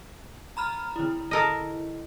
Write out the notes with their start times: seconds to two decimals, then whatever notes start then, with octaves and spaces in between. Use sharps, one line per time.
0.57 A#5 B5 F6
0.96 D3 E4
1.31 A4 A#4 D#5